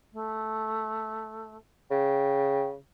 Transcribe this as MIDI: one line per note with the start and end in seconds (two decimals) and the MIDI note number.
0.13 1.57 57
1.91 2.76 49
1.91 2.68 79